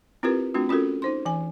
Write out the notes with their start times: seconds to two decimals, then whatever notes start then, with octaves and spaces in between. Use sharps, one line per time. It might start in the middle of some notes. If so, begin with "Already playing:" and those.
0.23 C4 E4 F4 G4 A#4 B4
0.54 A3 C4 D4 F4 F#4
0.69 C#4 F4 F#4 A4 A#4
1.02 D#4 C5 C6
1.26 E3 G#5